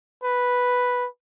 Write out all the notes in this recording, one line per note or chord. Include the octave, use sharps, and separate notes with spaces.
B4